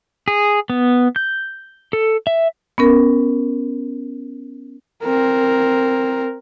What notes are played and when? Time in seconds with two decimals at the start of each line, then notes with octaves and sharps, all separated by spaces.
0.28 G#4
0.70 B3
1.16 G6
1.93 A4
2.27 E5
2.78 B3 C#4 A#4
5.04 C4 A#4